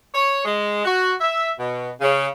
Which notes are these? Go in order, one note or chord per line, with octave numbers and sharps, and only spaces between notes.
C#5
G#3
F#4
E5
B2
C#3